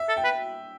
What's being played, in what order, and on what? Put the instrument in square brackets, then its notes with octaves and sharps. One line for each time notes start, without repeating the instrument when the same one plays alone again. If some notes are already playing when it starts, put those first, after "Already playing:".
Already playing: [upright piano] E5
[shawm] A4
[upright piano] G5
[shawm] B4